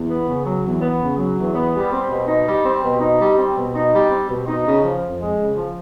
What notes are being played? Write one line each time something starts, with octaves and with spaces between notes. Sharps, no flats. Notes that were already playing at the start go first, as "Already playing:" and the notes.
Already playing: E2
B3
C#3
F#3
E2
B3
C#3
F#3
E2
B3
G3
C4
B2
D#4
G3
C4
B2
D#4
G3
C4
B2
D#4
G3
C4
B2
D#4
C#3
F3
F2
G#3
C#3
F3